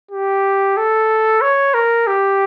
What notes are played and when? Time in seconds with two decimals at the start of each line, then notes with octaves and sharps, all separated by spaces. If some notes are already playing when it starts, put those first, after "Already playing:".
0.11 G4
0.77 A4
1.41 C#5
1.74 A#4
2.07 G4